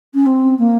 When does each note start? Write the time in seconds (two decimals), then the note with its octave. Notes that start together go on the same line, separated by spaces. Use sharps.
0.14 C#4
0.26 C4
0.58 A#3